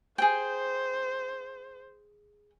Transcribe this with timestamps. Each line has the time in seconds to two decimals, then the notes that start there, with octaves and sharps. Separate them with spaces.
0.18 G#4 C5 G5